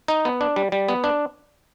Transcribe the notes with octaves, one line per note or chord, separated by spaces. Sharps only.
D#4
B3
D4
G3
G3
B3
D4